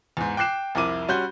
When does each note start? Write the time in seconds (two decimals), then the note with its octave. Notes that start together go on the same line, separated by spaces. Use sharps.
0.17 E2 G#2
0.37 G5 D6 F#6 C7 E7
0.75 C2 F2 E4 A#4 D6 D#7
1.08 G3 C#4 F#4 C6 G6 G7